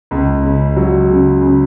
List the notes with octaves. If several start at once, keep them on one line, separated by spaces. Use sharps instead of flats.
C#2
C#3
F#3
C#3
C#3